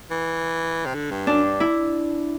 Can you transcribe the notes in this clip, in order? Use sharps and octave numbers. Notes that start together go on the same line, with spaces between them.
E3
C3
D3
G2
F#2 D4
G2
E4